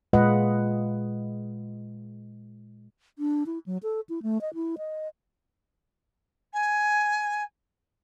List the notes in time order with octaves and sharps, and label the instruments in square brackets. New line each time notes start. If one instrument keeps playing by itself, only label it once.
[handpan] A#2 G#3 F4 B4 D#5 F#5
[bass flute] D4
E4
F#3
A4
E4
A3
D#5
E4
D#5
[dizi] G#5